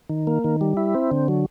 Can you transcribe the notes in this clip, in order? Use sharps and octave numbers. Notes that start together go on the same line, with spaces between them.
D#3
A#3
D#3
G3
E4
C4
D3
F#3